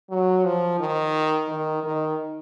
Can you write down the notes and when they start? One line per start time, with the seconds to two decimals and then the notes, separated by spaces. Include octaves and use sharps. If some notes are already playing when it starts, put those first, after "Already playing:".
0.10 F#3
0.44 F3
0.80 D#3
1.48 D#3
1.83 D#3